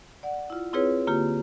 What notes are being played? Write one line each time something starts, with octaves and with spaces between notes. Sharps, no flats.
D5 F#5
E4 F4
C4 E4 F4 G#4 B4 C#5
D3 A#3 F4 G4